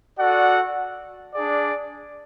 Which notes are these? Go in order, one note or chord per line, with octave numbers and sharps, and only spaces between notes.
F#4 A4 D5 F#5
D4 G#4 D5